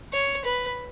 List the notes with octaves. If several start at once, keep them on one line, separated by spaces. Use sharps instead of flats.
C#5
B4